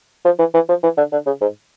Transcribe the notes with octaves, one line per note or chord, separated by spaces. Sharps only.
F3
E3
E3
F3
E3
D3
D3
C#3
G#2